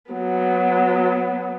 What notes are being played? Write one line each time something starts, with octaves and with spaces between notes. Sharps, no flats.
F#3 B3